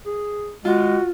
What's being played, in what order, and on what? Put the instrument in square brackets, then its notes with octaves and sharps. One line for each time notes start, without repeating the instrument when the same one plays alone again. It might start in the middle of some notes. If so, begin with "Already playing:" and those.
[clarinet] G#4
[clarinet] G#3 [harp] F4 [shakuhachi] F#4